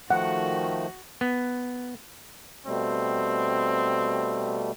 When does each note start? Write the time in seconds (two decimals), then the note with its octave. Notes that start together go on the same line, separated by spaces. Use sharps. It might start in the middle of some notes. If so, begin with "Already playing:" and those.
0.10 D#3 F3 A3 F#4 F#5
1.21 B3
2.66 B2 G3 A3 C4